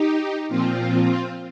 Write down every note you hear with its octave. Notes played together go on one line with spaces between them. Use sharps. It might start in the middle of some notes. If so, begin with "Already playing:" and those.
Already playing: D#4 G4
A#2 F3 C4 F4